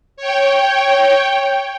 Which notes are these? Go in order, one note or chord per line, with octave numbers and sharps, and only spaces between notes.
C#5 G5